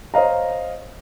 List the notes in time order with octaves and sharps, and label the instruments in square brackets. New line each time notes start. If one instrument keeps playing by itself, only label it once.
[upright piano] C5 C#5 D#5 F5 A#5